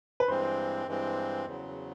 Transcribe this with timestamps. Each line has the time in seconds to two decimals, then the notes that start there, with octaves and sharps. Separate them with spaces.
0.20 B4
0.28 G2 E3 G#3 C4 C5
0.87 G2 E3 G#3 C4
1.46 E2 C#3 F#3